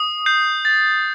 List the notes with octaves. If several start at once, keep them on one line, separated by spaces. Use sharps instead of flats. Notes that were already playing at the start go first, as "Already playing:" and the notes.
Already playing: D#6
G6 C7
A6